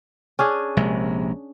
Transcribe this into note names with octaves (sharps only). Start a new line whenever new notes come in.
C#4 D4 G#4
A#1 C3 G#3